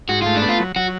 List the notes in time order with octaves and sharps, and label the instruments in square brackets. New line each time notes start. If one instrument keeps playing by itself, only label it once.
[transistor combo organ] G#2 [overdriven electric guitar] F#4
[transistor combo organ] A3 [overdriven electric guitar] F4
[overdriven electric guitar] D4
[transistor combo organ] B3
[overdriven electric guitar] F4
[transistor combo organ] F#3
[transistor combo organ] F#3 [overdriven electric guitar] F#4